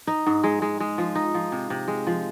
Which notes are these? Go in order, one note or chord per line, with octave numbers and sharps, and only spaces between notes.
D#4
G#2
G#3
G#3
G#3
F3
D#4
F3
C3
C3
G#3
F3